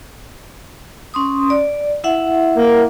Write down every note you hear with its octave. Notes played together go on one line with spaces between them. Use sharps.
C#4 C6 D#6
D5
E4 E5 F#5
A#3